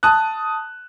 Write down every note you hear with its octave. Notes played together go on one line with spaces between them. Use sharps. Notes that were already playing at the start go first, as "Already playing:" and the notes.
A5 D#6 F#6